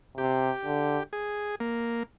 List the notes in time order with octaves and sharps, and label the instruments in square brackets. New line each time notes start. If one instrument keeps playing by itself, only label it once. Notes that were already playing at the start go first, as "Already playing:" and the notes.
[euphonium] C3 [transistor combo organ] G4
[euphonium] D3
[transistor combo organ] G#4
A#3